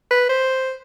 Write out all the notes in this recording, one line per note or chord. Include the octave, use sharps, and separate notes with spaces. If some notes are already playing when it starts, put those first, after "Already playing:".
B4
C5